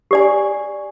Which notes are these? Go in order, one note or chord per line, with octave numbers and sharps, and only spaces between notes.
G4 D5 G#5